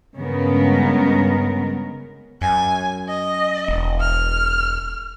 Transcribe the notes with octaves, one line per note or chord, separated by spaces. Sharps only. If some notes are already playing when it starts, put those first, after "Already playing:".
G2 C#3 G#3 B3 A#4
F#2 G#5
D#5
E1
F6